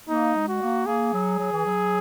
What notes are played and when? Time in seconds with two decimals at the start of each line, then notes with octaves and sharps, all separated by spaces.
0.09 A#3 D#4
0.35 G#3
0.48 F#4
0.61 A#3
0.86 A#3 G#4
1.12 F#3
1.38 F#3
1.52 E3
1.65 F#3